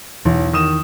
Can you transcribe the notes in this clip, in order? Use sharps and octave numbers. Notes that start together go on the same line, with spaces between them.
B1 E2 E3
D#3 D#6 E7